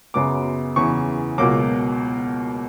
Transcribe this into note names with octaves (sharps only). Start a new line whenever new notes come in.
F#2 C#3 F#3 B3 D6
E2 C#3 E3 C#6
C#2 B2 F#3 A#3 D6